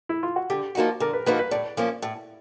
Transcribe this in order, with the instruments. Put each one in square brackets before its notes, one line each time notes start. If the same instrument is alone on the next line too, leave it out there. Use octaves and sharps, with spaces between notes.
[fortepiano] E4
F4
F#4
[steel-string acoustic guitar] D3 [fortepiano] G4
[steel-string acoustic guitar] F3 A#3 D#4 F#4
[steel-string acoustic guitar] D3 [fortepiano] A#4
[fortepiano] B4
[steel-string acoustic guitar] F3 A#3 D#4 F#4 [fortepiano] B4
[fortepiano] B4
[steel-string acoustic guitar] A2 [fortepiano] D5
[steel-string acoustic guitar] F3 A#3 C#4
A2